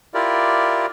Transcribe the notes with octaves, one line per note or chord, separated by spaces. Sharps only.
E4 F4 G4 A#4 D5